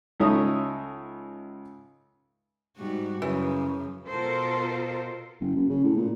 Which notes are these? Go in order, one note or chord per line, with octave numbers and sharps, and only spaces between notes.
C#2 D#4 A4 C#5 E5 D#6
G#2 G3 F#4
F#2 C#3 E3
B2 F4 A4 A#4 C5
F#1
F#2
C#3
A2
A#2